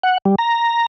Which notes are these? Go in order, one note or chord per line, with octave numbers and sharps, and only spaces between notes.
F#5
G3
A#5